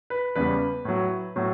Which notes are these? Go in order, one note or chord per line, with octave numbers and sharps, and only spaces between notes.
B4
E2 C#3 G3 B4
A2 F#3
A2 F#3